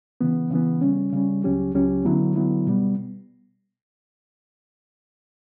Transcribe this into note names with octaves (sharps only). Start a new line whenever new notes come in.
C#3 E3 B3
C#3 E3 B3
C#3 G3 C#4
C#3 G3 C#4
C#2 C#3 F#3 C#4 G4
C#2 C#3 F#3 C#4 G4
D3 F#3 B3 E4
D3 F#3 B3 E4
B2 G3 B3